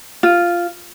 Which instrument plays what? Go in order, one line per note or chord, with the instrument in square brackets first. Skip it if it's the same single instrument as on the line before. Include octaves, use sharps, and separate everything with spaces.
[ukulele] F4